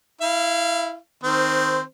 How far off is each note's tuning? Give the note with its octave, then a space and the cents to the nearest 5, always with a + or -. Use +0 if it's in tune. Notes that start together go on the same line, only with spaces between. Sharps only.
E4 +0 F5 -25
D#3 +0 C4 +0 C5 -20